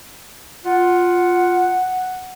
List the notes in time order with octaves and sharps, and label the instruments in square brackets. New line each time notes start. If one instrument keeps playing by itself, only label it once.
[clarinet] F4 [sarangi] F#5